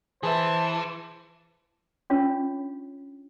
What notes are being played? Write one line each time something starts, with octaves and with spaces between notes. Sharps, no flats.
E3 G#4 B4 C5 E5 A5
C#4 D4 F4 C#5